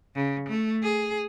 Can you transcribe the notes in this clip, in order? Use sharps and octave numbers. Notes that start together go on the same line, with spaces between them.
C#3
A3
G#4